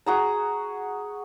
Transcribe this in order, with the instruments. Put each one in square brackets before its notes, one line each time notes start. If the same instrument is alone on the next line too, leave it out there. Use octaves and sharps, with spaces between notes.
[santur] F#4 G#4 A#5